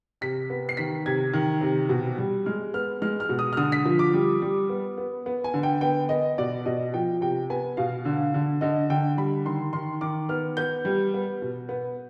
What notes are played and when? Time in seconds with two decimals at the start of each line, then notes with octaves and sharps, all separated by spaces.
0.21 C3 B6
0.50 B3
0.69 C7
0.77 D#3 B6
1.06 C3 G#6
1.33 D#3
1.61 C3
1.89 B2
2.18 G3
2.46 G#3 F6
2.74 B3 F6
3.02 G#3 F6
3.20 F6
3.29 B2
3.39 D#6
3.53 F6
3.57 D3 D#6
3.72 B6
3.85 F3
3.99 D6
4.13 G3
4.42 G3
4.69 B3
4.98 B3
5.26 B3
5.44 G#5
5.54 D3
5.63 G5
5.81 B3 G5
6.09 B3 D#5
6.38 B2 D5
6.66 B2 D#5
6.94 F3 G5
7.21 C3 G5
7.50 B3 G#5
7.77 B2 F5
8.05 D3
8.34 D3
8.61 D3 D#5
8.90 D3 G5
9.17 G3 B5
9.45 D#3 C6
9.73 D#3 C6
10.01 D#3 D6
10.29 B3 F6
10.57 B3 G6
10.85 G3
11.14 B3
11.42 B2
11.69 B3